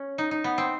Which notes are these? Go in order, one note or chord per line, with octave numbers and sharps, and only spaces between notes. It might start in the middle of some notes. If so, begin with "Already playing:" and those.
Already playing: C#4
D#4
D#4
B3
C4